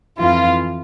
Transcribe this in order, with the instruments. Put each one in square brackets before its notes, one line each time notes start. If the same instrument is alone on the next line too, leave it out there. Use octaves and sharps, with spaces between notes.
[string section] F2 E3 F4